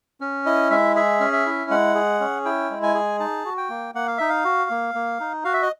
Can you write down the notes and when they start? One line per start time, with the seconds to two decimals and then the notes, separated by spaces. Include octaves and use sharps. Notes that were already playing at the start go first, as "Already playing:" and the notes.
0.21 C#4
0.46 E4 D#5
0.71 G#3 E5
0.95 G#4 E5
1.20 C#4
1.33 E5
1.46 E4
1.70 G#3 F#5
1.95 G#4
2.20 C#4
2.45 E4 G5
2.71 G#3
2.83 G#5
2.95 G#4
3.20 D#4 A5
3.45 F#4
3.57 G5
3.69 A#3
3.95 A#3 F#5
4.07 F5
4.18 D#4 E5
4.29 F5
4.45 F#4
4.70 A#3
4.95 A#3
5.20 D#4
5.44 F#4 F5
5.53 E5
5.63 D#5